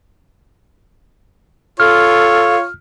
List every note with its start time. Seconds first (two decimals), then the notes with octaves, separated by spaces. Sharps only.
1.80 F4 A4 C#5 F6